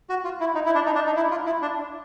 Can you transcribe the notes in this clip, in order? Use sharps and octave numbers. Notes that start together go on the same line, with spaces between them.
F#4
F4
E4
D#4
E4
D4
D#4
D4
D#4
E4
F4
E4
D4